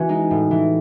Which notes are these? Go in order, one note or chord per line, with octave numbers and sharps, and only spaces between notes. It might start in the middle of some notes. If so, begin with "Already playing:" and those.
Already playing: E3 C#4 F#4 B4
G#3 D#4
A2
E3